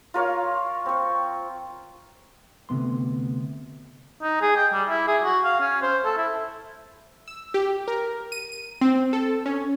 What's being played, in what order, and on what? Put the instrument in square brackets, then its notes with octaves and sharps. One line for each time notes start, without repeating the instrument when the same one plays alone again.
[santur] F4 A#4 C#5 F5
C4 C#6
[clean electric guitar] D2 G#2 C3 B3 C6
[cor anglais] D#4
G#4
G5
G3
E4
G#4
F#4
F5
C#4
C5
A4
E4
[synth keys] E6
G4
A#4
D#7
D#7
C4
A4
C#4